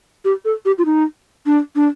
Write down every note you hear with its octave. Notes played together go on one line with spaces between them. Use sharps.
G4
A4
G4
F4
D#4
D4
D4